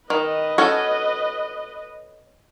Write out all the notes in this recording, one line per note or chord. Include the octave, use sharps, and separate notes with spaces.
D#3 B4 D#5
C#4 F#4 A4